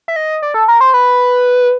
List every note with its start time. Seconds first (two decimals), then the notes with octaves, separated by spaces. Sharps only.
0.08 E5
0.16 D#5
0.42 D5
0.54 A4
0.68 A#4
0.81 C5
0.94 B4